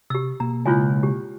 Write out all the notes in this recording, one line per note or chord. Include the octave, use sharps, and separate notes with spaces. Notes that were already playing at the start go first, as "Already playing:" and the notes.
C3 G4 E6
B2 A#3 A#5
C#2 E4 F4 G#5
G4